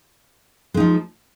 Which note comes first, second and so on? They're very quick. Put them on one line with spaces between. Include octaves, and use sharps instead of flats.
G#3 D#4 F3